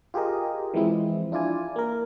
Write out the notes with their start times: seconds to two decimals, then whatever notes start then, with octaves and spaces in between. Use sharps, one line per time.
0.14 F4 G4 G#4 A#4 D#5
0.74 E3 F3 G#3 C4 E4
1.32 D4 E4 F4 D5 G#5
1.76 A#3 A#4